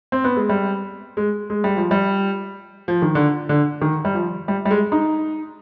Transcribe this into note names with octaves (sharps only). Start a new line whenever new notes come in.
C4
B3
G#3
G3
G#3
G#3
G3
F3
G3
F3
D#3
D3
D3
D#3
G3
F3
G3
G3
G#3
D#4